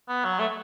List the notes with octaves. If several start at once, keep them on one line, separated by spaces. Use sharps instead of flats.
B3
F#3
A3